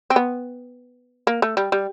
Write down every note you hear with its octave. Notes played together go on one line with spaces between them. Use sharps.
C4
B3
A#3
A3
G3
G3